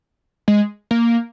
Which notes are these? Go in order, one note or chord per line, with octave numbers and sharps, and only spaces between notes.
G#3
A#3